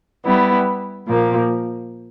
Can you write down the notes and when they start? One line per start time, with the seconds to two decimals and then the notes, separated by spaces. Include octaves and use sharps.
0.25 G3 B3 E4
1.06 A#2 F3 A#3